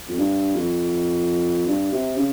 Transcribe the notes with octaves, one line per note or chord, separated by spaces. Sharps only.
F2
G2
F2
G2
C3
C#3